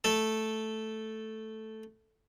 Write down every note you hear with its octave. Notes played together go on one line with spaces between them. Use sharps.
A3 A4